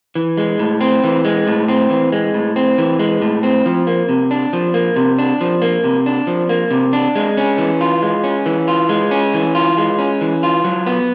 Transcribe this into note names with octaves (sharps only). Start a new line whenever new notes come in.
E3
G#3
A2
C4
E3
G#3
A2
C4
E3
G#3
A2
C4
E3
G#3
A2
C4
F3
A#3
C3
D4
F3
A#3
C3
D4
F3
A#3
C3
D4
F3
A#3
C3
D4
G#3
C#4
E3
F4
G#3
C#4
E3
F4
G#3
C#4
E3
F4
G#3
C#4
E3
F4
F#3
B3